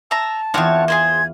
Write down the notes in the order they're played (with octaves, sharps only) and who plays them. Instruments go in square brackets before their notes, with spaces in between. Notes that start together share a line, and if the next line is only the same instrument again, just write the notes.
[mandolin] E5 A#5 [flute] A5
[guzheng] E2 F4 [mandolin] C4 C#5 F#5
[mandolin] G#4 A#4 C5 [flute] G#6